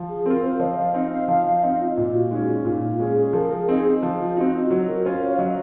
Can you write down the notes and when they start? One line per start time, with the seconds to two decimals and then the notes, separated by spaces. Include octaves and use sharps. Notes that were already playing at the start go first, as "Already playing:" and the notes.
Already playing: F3
0.09 G#4
0.26 C4 F4 A#4
0.43 C5
0.60 F3 D#5
0.77 F5
0.94 C4 D#4 F5
1.11 F5
1.28 F3 F5
1.46 F5
1.62 C4 D#4 D#5
1.80 F4
1.97 A#2 F4
2.14 F#4
2.31 G#3 C#4 D#4
2.49 F4
2.65 A#2 D#4
2.82 F4
2.99 G#3 C#4 G#4
3.17 G#4
3.33 F3 A#4
3.51 G#4
3.68 C4 D#4 G#4
4.03 F3
4.19 F4
4.36 C4 D#4 F#4
4.53 F4
4.70 F#3 F#4
4.88 A#4
5.04 C#4 F4 C5
5.22 C#5
5.31 F5
5.39 F#3 D#5